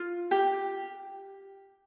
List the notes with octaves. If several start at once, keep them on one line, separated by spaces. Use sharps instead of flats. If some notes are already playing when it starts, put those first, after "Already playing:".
Already playing: F4
G4